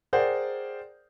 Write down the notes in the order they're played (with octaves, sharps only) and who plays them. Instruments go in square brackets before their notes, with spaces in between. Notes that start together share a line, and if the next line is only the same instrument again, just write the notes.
[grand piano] G#4 A#4 C5 D5 F#5 G5